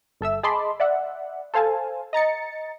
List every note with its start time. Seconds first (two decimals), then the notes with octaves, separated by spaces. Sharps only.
0.21 G1 A4 E5 E6
0.43 G#4 D#5 A5 B5 C6 D6
0.80 D5 E5 F#5
1.54 A4 C5 F5 G#5 A5
2.13 D#5 A#5 A6 C#7